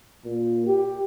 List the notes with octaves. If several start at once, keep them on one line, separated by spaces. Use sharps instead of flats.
A#2
G4